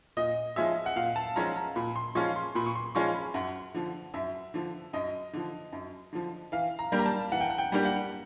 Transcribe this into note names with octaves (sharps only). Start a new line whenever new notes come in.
A#2 D#5
F3 G#3 C#4 F4 E5
F#5
A#2 F5
A5
F3 G#3 C#4 F4 A#5
A#5
A#2 B5
C6
F3 G#3 C#4 F4 C#6
C6
A#2 B5
C#6
C6
F3 G#3 C#4 F4 C#6
B5
F#2 F#5
D3 F3
F#2 E5
D3 F3
F#2 D#5
D3 F3
F#2
D3 F3
E3 F5
A#5
G3 A#3 D4 G4
A#5
A5
E3 F#5
G5
F#5
G5
G3 A#3 D4 G4
F#5